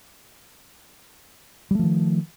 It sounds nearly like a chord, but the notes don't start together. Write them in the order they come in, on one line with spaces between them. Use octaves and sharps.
G3 A3 F3 D#3